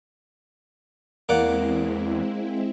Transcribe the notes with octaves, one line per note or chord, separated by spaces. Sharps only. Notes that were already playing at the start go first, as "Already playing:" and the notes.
E2 G#3 A#3 C4 E4 D5 F#5